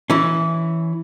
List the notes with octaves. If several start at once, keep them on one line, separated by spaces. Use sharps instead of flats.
E3 C#4